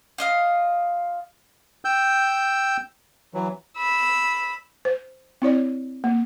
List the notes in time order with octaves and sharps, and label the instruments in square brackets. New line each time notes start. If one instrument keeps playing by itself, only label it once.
[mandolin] F4 D#5 F5
[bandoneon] G5 E6 G6
E3 F#3
[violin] B5 E6
[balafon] C5
C4 E4 C#5 D5
A#3